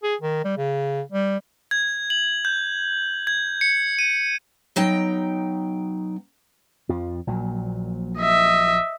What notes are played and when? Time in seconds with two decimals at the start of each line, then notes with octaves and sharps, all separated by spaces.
0.03 G#4
0.21 D#3
0.45 G3
0.58 C#3
1.12 G3
1.71 G#6
2.10 F#7
2.45 G6
3.27 G#6
3.61 C#7
3.99 D#7
4.76 B2 F#3 D#4 G5
6.89 F2 F3
7.27 A#1 A#2 F#3
8.18 D#5 E5